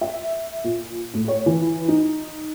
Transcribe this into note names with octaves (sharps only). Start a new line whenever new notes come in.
E5
A#2
A2
C#5
E3
D#4